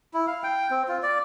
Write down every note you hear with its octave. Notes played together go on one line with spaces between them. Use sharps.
E4
F5
G5
C4
F4
D5